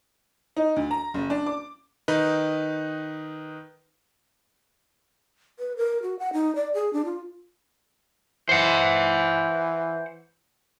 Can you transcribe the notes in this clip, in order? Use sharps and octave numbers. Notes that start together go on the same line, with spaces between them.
D#4
D2
A#5
F#1
D4
D6
D#3 D#4 B4
B4
A#4
F#4
F#5
D#4
D5
G#4
D4
F4
E3 C5 F#5